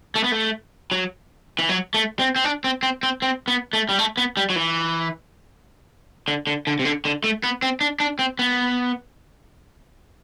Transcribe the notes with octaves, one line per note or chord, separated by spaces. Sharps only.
A3
B3
A3
F#3
E3
F#3
A3
C4
C4
D4
C4
C4
C4
C4
B3
A3
G3
A3
B3
G3
F#3
E3
D3
D3
D3
C3
D3
D3
A3
B3
C4
D4
D4
C4
B3